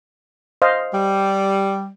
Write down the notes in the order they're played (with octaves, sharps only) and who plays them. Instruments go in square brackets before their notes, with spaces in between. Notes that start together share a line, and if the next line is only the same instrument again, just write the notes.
[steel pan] C5 D#5 F5
[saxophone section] G3